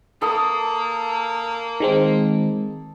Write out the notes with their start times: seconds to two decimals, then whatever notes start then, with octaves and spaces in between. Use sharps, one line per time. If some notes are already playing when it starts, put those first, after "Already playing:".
0.22 A#3 A4 D#6
1.80 D#3 G#3 C4